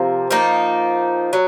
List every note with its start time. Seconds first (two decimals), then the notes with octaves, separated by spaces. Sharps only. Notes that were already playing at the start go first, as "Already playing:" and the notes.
Already playing: C3 F3 A#3
0.31 F3 A#3 D#4
1.33 F#3